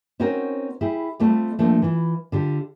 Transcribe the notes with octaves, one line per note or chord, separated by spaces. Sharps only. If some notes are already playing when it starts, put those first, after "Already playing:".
C4 C#4 D#4 F#4 A#4 C5
E4 G4 G#4
G3 A3 C4 F4 D5
F3 A3 A#3 D4
E3 F4
D3 F4 G4